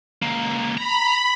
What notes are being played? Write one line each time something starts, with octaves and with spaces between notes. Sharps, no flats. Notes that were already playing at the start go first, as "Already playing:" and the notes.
C#2 A#3
A#5 B5